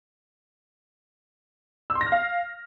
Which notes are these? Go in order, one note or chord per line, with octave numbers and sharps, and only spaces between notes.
E6
C6
A#6
F6
F5